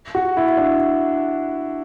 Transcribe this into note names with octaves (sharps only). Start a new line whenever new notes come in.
F#4
E4
D4